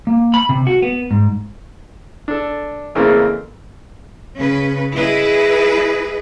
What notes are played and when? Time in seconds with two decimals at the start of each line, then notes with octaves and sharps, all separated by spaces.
0.07 A#3
0.34 B5
0.49 C3
0.67 F#4
0.82 B3
1.11 G#2
2.28 D4 A4
2.95 F2 C#3 E3 A3 A#3 C4
4.38 C#3 C#4 B4
4.95 E4 G#4 B4 D#5